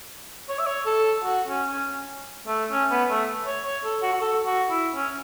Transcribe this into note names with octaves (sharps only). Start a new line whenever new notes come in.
C#5
E5
C#5
A4
F#4
C#4
C#4
A3
C#4
B3
A3
C#5
C#5
A4
F#4
F#4
A4
F#4
E4
C#4